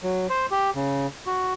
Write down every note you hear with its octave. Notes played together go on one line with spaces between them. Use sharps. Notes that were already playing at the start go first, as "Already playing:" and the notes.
F#3
C5
G4
C#3
F#4